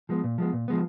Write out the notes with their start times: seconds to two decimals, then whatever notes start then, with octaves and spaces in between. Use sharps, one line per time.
0.09 F3 G#3 B3
0.24 A#2
0.38 F3 G#3 B3
0.53 A#2
0.68 F3 G#3 B3